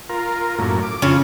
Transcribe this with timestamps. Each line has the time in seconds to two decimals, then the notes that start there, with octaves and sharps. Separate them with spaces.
0.09 F4 A#4
0.58 F#2 A2 A#3
0.83 D6
1.02 F2 C#3 F4 C#5